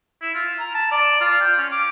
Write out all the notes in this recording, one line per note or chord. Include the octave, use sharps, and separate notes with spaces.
E4
F4
A#5
A5
D5
F4
G5
C#4
D6